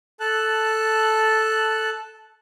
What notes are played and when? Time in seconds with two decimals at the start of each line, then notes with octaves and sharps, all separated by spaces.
0.20 A4 A5 F#6